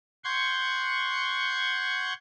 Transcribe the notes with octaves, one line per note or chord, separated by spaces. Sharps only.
F#5 C6 C#6 G6 G#6